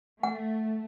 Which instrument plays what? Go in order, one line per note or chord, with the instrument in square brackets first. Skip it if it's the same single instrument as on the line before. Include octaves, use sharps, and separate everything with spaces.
[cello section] A3 [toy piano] F#5